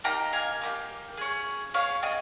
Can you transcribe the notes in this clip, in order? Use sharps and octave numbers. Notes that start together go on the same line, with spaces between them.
A#3 D#4 G4 G5 A#5
F5 G#5
A#3 D#4 G4
C#4 G#4
C#4 G#4 C#5 F5
D#5 G5